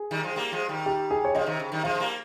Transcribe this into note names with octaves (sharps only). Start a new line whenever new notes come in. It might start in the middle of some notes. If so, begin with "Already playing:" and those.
Already playing: G#4
D#3 G3
F3 G#3
G3 A#3
F3 G#3
D#3 G3
G4
G#4
C#5
C#3 F3 D#5
C3 D#3
C#3
D#3 G3
F3 G#3 F5
G#3
G3 A#3